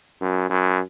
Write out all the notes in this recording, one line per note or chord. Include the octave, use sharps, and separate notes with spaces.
F#2
F#2